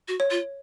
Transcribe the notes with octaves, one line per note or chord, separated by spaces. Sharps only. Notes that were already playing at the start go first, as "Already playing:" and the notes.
F#4
C#5
F4